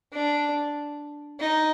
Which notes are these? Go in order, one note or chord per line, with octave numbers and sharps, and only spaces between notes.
D4
D#4